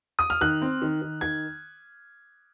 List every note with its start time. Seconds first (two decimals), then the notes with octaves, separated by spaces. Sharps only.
0.19 D#6
0.30 F6
0.41 D#3 F#6
0.62 C4
0.82 D#3
1.02 D#3
1.21 D#3 G#6